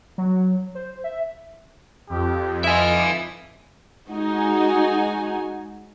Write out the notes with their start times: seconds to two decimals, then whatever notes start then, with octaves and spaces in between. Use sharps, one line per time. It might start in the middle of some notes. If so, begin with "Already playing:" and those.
0.18 F#3
0.75 C5
1.04 E5
2.10 F2 G4
2.64 E4 F4 D#5 E5 G#5
4.09 G#3 D#4 F#4 G#5